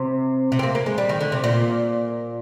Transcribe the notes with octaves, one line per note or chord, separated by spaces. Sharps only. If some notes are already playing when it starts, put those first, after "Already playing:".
Already playing: C3
C3
C4
A#3
A#3
G#3
G3
D#3
D3
C3
A#2